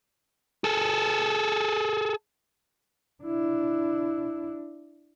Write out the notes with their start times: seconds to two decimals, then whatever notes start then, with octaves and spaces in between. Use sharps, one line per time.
0.64 G#4 A4
3.23 D4 E4